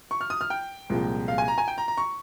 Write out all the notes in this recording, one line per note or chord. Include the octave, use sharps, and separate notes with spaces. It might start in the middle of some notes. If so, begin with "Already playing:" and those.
C#6
F6
D#6
F6
G5
C2 A#2 F3 G#3
F5
G#5
A#5
G#5
G5
A#5
A#5
C#6